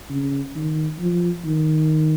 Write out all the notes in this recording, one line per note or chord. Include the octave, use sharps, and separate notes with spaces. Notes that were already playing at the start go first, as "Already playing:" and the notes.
C#3
D#3
F3
D#3